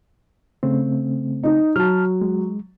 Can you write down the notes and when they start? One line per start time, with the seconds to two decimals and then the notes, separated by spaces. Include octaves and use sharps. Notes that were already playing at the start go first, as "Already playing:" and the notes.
0.63 C#3 A3 C4
1.44 D#4
1.76 F#3 A5 F6
2.21 G#3